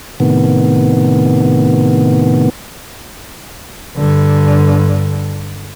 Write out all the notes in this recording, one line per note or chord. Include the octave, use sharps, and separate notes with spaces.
A2 C3 D#3 B3
G2 D3